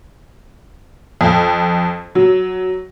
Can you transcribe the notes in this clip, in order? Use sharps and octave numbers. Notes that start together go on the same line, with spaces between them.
F2
F#3